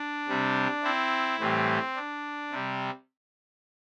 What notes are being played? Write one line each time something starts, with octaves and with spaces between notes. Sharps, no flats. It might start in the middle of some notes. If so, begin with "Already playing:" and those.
Already playing: D4
C3 G3
C4 E4
A2 E3 G3 C4
D4
C3 G3